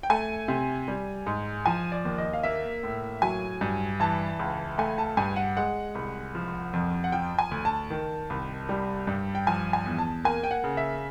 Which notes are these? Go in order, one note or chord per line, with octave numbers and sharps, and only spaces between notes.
G5
A3 G#5
C3
G3
G#2
F3 G#5
D5
D#2
D#5
F5
A#3 E5
A2
F#3 G#5
G2
E3 A5
C#2
A3 G#5
A5
G2 G#5
F#5
G#3 F#5
C2
F3
F2
F#5
F3 G5
G#5
D2
A5
D#3
C2
G3
G2
G5
F3 G#5
G#5
E2
A5
A#3 G#5
G5
F#5
C#3
E5